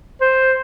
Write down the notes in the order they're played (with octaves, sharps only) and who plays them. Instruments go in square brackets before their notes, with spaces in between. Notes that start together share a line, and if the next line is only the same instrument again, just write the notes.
[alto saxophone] C5